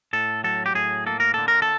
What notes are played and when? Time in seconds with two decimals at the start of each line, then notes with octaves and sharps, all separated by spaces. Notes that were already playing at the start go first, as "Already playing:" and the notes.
0.13 A2 A4
0.44 F#3 A4
0.66 G4
0.75 A2 G#4
1.06 A#3 A4
1.20 A#4
1.34 D3 A4
1.48 A#4
1.62 A4